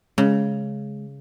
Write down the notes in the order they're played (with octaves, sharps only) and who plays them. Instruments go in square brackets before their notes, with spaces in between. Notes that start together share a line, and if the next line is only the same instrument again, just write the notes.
[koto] C#3 [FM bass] G#3